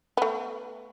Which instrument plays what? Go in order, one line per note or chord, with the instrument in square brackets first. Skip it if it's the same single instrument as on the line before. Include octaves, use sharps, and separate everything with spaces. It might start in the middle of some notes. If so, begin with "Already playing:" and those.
[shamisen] A3 B3